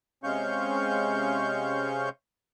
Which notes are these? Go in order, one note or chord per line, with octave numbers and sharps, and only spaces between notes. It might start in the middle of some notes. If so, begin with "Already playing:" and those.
C3 G#3 C#4 F5 C#6 G6